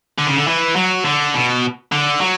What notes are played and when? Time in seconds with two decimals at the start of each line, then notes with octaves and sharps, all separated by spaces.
0.18 D3
0.27 C#3
0.36 D3
0.47 E3
0.76 F#3
1.05 D3
1.34 B2
1.92 D3
2.21 F#3